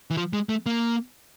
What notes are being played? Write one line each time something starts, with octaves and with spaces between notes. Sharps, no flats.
E3
F3
G#3
A3
A#3